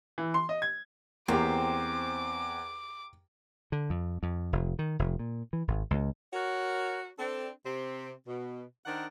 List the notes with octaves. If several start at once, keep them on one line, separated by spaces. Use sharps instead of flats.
E3
C6
D#5
G#6
E2 A#3 C4 G4 D6
D3
F2
F2
F1
D#3
F1
A#2
E3
G#1
C#2
F#4 A#4 C#5
C4 D4 A4
C3 C4 G4
B2
D#3 D4 D#4 A#4 C5 F#5